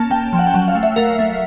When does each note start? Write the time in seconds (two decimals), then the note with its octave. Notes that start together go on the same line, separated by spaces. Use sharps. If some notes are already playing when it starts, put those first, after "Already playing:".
Already playing: A#3 C#4 A5
0.10 A#3 G5
0.33 F3
0.39 F#5
0.47 G5
0.54 F#3 F#5
0.68 F5
0.75 A3
0.83 E5
0.96 A3 A#4
1.19 A3